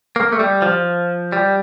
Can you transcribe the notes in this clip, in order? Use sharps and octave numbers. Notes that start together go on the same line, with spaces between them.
A#3
A3
G3
F3
G3